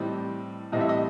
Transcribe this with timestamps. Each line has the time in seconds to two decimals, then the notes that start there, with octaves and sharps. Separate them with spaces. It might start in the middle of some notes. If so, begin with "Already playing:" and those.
Already playing: A2 E3 G3 C4 D#5
0.72 A2 E3 G3 C4 D#5
0.81 E5
0.89 D#5